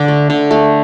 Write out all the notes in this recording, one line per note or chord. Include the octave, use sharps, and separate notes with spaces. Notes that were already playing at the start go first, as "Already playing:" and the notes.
Already playing: D3 D4
A3
D3
A3